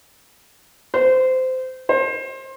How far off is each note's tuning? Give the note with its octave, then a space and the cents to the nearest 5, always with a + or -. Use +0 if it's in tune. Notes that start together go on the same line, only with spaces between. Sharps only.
C5 -20
C5 +25